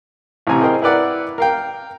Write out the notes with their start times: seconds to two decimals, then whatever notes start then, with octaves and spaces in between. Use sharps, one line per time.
0.47 A1 C3 G#5 A#5
0.61 G#4 A#4 C5 D#5 G5
0.82 E4 A#4 B4 D5 F#5
1.38 A#4 F5 G5